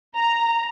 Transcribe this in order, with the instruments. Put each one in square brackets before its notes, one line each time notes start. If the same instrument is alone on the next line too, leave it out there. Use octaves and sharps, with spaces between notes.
[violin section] A#5